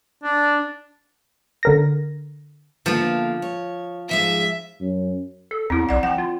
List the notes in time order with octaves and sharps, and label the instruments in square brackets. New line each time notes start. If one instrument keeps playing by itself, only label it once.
[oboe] D4
[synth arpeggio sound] D3 A#4 A#6
[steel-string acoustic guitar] E2 D3 A#3 [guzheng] F3
[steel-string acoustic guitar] C#5
[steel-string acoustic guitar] G#2 F3 G#3 [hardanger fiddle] E5
[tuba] F#2
[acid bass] A4
[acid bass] E2 [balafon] C4 E4
[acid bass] B1 [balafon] D5 F#5
[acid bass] F3 [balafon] F#5 G5
[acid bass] F4